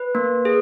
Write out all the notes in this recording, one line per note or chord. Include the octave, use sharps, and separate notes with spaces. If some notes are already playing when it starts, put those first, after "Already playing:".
Already playing: B4
A#3
G#4